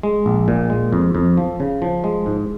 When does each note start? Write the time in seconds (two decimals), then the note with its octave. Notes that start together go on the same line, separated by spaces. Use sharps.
0.03 G#3
0.26 A#1
0.48 A#2
0.70 G#3
0.93 F2
1.15 F2
1.37 F3
1.60 C#3
1.82 F3
2.04 G#3
2.26 G#2